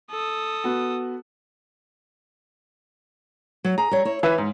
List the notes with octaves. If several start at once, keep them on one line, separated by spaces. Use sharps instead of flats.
A4 D#6
B3 F#4
F#3
G#4 A#5
G3 C#5
E4 C#5
E3 B4 E5 F5
G#2